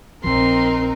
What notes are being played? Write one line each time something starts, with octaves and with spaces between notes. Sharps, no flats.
A#1 F3 C4 D#4 A#4 C6